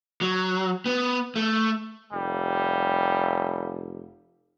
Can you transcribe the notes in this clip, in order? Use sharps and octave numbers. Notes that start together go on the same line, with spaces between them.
F#3
B3
A3
F1 G3